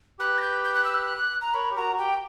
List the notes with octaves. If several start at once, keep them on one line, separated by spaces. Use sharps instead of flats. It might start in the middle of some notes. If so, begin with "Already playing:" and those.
G4 B4 F#6
A#6
G6
G6
F#6
E6
F#6
A#5
A#4 C#5 B5
G4
F#4 A#4 A#5
F#4
G4 G5